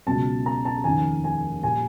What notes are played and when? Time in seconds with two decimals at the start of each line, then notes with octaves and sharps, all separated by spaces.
0.06 C#2 B2 F#3 A5
0.46 A#5
0.65 A5
0.84 F1 D#2 C#3 G#5
1.24 G#5
1.63 A#2 G3 G#5